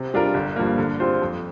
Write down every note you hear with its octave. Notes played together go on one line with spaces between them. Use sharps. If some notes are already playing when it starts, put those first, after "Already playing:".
Already playing: C3
G3 D4 F4 A#4
G1
G2 F3 A#3
D3
G3 C4 F4 C5
F2